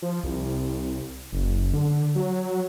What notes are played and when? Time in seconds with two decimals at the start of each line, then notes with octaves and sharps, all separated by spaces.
0.02 F3
0.23 C2
1.32 F#1
1.73 D3
2.15 F#3